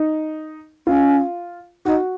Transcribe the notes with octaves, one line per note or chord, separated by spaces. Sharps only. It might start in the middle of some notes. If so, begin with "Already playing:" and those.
Already playing: D#4
C#4 F4
D#4 F#4